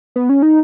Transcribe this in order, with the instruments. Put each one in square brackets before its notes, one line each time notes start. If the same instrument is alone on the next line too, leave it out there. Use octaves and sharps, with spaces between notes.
[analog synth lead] B3
C#4
D#4